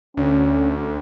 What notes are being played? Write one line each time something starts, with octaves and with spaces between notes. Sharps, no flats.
D2 C#4